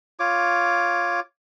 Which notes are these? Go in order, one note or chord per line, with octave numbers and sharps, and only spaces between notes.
F4 C#5 D6